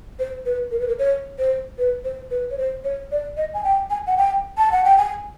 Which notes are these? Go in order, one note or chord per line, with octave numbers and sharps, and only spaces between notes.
C5
B4
A#4
B4
A#4
C#5
C5
B4
C5
B4
C#5
C5
C#5
D5
D#5
G#5
G5
G#5
F#5
G5
A5
F#5
G5
G#5